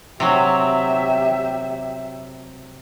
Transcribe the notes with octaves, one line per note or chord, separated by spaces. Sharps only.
C3 F#3 G4 E5